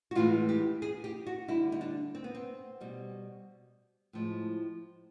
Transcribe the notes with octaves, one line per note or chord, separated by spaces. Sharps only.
F#4
A2 E3 G#3 F4
G4
G#4
G4
F#4
D3 G3 E4
D#4
D4
C4
B3
C4
B2 G3
A2 F3 G#3